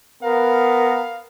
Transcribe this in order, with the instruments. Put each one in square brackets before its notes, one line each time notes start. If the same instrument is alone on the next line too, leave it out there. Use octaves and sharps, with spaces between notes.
[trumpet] B3 [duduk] A#4 [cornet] F5